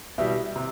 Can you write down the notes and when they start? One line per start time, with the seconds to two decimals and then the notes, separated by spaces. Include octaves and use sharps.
0.18 B2 G3 E4
0.56 C3